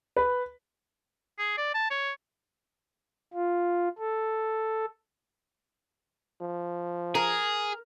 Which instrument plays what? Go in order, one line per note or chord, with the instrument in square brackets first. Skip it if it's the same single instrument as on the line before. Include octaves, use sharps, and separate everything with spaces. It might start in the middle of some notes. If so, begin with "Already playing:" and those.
[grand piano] B4
[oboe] G#4
D5
A5
C#5
[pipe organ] F4
A4
[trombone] F3
[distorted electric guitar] G#4 [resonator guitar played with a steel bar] A#4